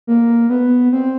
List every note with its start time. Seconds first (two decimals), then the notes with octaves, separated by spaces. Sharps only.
0.07 A#3
0.50 B3
0.93 C4